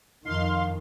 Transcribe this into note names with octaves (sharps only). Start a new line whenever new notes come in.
F2 D#3 D#4 F5 C6